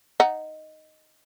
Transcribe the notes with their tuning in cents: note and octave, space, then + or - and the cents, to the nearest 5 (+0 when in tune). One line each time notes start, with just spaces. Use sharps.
D#4 +0 F#5 +0